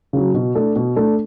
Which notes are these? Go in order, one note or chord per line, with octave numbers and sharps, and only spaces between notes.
C#3 F#3
B2
A3 D4 A4
B2
A3 D4 A4